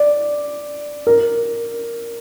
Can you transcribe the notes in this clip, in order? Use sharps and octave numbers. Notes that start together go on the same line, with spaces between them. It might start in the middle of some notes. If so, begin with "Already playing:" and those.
Already playing: D5
A#4